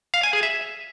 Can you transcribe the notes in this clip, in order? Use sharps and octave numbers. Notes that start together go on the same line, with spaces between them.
F5
G#5
G#4
E5